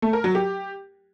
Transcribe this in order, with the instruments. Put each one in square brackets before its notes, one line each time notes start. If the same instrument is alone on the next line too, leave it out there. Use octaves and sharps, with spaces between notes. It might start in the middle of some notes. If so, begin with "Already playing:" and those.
[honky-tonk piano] A3
A#4
F#3
G4